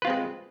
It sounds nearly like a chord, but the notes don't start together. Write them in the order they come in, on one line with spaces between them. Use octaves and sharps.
B4 F4 C4 G#3